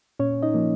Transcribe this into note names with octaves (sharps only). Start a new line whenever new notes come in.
A#2 C#4 C#5
D#4 D#5
F3 A#3